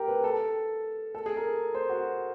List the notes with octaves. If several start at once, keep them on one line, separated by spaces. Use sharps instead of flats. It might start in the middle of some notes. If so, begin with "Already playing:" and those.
Already playing: G4 A#4
B4
A4
A4
G#4
A#4
C5
F#4